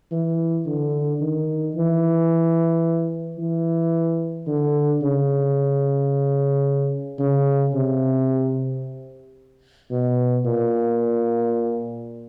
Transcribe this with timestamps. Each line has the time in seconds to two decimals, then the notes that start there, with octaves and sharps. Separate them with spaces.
0.12 E3
0.66 D3
1.21 D#3
1.75 E3
3.38 E3
4.47 D3
5.02 C#3
7.19 C#3
7.74 C3
9.91 B2
10.45 A#2